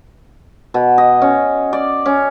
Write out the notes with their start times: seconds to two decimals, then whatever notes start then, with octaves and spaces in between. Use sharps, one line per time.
0.74 B2
0.98 D#5
1.21 C#4
1.73 D5
2.06 C#4